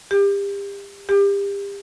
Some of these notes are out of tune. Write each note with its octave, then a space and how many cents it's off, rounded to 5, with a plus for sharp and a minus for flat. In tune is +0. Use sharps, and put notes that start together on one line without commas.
G4 +30
G4 +30